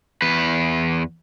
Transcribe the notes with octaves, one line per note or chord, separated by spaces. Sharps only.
E2 B4